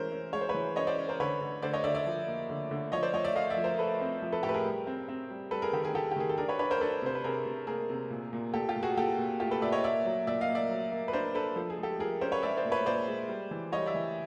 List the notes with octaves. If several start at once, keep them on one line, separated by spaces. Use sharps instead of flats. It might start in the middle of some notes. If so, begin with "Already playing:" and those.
Already playing: E3 G#3 C#4 A#4 C5
C#4
G#3 C#5
C5
B4 C#5
E3
C#4 C#5 D#5
C5 D5
C#4
A#4 C5
D3 B4 C#5
D3
D3 C5 D5
C#5 D#5
D3 D5 E5
D5 E5
F3
A#3
D3
D3
F3 C#5 D#5
C5 D5
F3 C#5 D#5
D5 E5
A3 D#5 F5
D5 E5
F3
A#4 C5
A3 A4 B4
C4
F3
A4 B4
A2 G4 A4
B4
G#4 A#4
G3
C4
C4
G3
G3 A4 B4
G#4 A#4
D#3 G4 A4
G#4 A#4
D#3 G4 A4
G4
D#3 G#4
A4
D4 G#4 A#4
B4 C#5
D4 B4 C#5
A#4 C5
D4 A4 B4
C3 C5
B4
C3 G#4 A#4
C3
A#3 G#4 A#4
C3
A#2
A#2
A#2 G4 A4
F4 G4
A#2
F#4 G#4
A#2 G4 A4
A#2
A3 F4 G4
A4 B4
A#2 D5 E5
C#5 D#5
A#3 D5 E5
F#3
A#2 D5 E5
D#5 F5
A#3
D5 E5
F#3
A#3
B4
D4 A#4 C5
D4 A4 B4
F3 A4
G#4
G#3
G4 A4
F3 G#4 A#4
C#4 A#4 C5
B4 C#5
G#3 D5 E5
C5 D5
A#2
B4 C#5
A#2 C5 D5
G#3
G3
E3
G3 C#5 D#5
D5 E5
E3